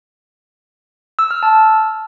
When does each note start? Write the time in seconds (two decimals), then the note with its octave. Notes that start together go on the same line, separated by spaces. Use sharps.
1.19 E6
1.31 F6
1.43 A5